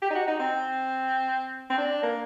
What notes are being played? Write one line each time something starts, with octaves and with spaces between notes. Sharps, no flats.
G4
D#4
F#4
D#4
C4
C4
D4
A#3